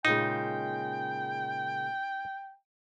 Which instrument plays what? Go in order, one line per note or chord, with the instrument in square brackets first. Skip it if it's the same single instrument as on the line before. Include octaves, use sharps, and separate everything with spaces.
[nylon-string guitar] A#2 C#3 G#3 [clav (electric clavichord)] D#4 [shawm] G5